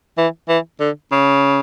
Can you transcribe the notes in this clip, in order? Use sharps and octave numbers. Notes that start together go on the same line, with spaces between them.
E3
E3
D3
C#3